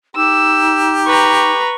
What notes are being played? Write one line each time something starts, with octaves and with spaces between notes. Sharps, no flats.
D#4 G4 E6
B4 A#5 C#6